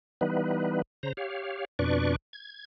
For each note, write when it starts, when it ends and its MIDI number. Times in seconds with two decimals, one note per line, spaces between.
0.21 0.82 52
0.21 0.82 55
0.21 0.82 59
0.21 0.82 63
0.21 0.82 71
1.03 1.13 49
1.03 1.13 72
1.03 1.13 82
1.17 1.65 67
1.17 1.65 73
1.17 1.65 77
1.79 2.16 41
1.79 2.16 47
1.79 2.16 62
1.79 2.16 71
1.79 2.16 74
1.79 2.16 85
2.33 2.65 92